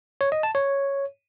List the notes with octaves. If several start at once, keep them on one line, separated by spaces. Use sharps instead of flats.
C#5
D#5
A5
C#5